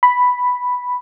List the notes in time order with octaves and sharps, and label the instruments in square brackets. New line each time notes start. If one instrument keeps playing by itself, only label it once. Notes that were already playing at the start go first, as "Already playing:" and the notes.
[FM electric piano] B5